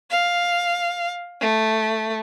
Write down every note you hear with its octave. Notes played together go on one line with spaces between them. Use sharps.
F5
A3